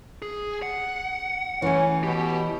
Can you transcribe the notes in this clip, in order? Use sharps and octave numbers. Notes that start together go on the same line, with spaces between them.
G#4
F#5
E3 A3 C#4
B2 G4